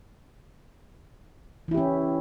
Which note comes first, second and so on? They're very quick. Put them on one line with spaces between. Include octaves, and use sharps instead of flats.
E3 E4 G4 C#4